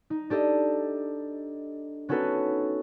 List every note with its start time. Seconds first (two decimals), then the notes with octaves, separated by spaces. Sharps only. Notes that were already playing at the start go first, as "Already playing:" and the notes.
0.10 D#4
0.30 D4 G4 A4 D#5
2.09 B3 C#4 D#4 F#4 A4 B4